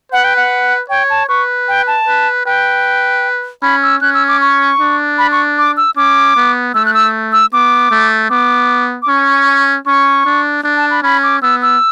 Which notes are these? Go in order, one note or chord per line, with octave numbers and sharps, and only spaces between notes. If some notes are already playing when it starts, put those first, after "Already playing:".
B4 F#5
G5
F#5
C#5 G5
A5
B4 C#6
G5
A5
B4
B4 G5
C#4 B5
E6
C#4 F#6
E6
D6
C#6
D4
B5
C#6
D6
E6
C#4 D6
B3
A3 E6
F#6
E6
E6
B3 D6
A3
B3 D6
D6
C#4 C#6
C#4 C#6
D4
D4
A5
B5
C#4 B5
D6
B3 E6
E6